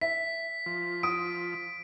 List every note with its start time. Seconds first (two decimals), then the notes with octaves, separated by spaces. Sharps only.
0.01 E5 B6
0.66 F3
1.03 D#6 D7